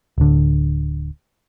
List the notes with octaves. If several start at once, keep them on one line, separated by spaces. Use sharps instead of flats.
D1 D3